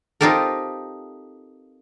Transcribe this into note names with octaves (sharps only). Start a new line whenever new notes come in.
C4 D#4 F4 G4 A4 A#4